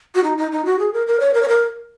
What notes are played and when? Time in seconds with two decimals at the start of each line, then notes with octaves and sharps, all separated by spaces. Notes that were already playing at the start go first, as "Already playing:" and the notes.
0.15 F#4
0.24 D#4
0.38 D#4
0.52 D#4
0.65 F#4
0.79 G#4
0.93 A#4
1.07 A#4
1.20 C#5
1.34 A#4
1.42 C#5
1.48 A#4